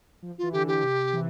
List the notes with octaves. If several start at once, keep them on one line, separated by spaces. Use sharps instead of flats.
F3
E3 F4
D3 G4
G4
C3
E3